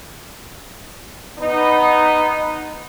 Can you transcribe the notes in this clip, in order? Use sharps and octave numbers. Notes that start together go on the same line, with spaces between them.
B3 D#4